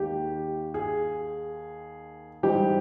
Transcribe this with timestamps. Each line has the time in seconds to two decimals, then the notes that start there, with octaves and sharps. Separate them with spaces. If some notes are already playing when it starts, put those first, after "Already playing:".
Already playing: D#2 D#3 G#3 G4
0.74 G#4
2.43 G#2 E3 G3 G4